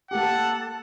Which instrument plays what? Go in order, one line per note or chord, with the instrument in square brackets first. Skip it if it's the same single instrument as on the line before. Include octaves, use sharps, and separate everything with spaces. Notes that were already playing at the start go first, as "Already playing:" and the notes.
[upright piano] A#3 G4 [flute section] A4 A5 [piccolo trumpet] F#5